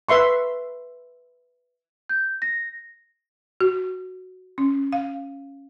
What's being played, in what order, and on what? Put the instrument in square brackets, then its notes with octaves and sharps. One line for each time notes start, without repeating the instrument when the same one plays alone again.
[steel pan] B4 E5 C6 C#6
[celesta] G6
A#6
[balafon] F#4
C#4
F5